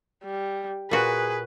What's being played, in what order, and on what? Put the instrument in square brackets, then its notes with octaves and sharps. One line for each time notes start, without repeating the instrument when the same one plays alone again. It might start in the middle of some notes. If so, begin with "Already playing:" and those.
[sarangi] G3
[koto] A#2 F#4 [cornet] G#4 [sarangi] B4